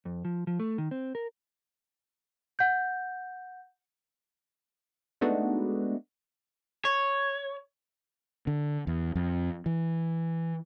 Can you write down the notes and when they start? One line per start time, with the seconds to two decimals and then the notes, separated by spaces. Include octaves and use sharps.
0.05 F2
0.25 F3
0.47 F3
0.60 A3
0.78 D#3
0.91 C4
1.15 A#4
2.59 F#5 G6
5.21 G#3 A3 B3 D4 D#4 F#4
6.85 C#5
8.47 D3
8.87 E2
9.15 F2
9.66 E3